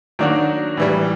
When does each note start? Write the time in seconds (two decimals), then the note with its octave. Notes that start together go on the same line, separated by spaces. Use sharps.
0.19 D#3 F#3 A#3 D4 F#4
0.77 A2 E3 G3